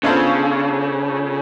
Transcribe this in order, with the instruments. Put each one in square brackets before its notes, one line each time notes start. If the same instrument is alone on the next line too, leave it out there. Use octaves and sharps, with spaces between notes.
[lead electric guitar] C#3 [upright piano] B3 D4 F4 A4 C5